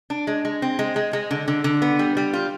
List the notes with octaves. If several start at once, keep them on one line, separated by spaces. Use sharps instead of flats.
D4
G#3
G#3
C4
G#3
G#3
G#3
D3
D3
D3
B3
G3
G3
F4